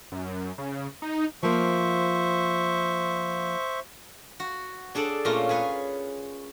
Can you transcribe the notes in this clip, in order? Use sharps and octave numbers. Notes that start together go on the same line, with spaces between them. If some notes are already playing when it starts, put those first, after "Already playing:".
F#2
C#3
D#4
F3 A#3 C5 E5 C#6
F#4
D4 G#4 A4 D5
A#2 A3 C#4 F4 A#5
G#4 B4 C#5 G#5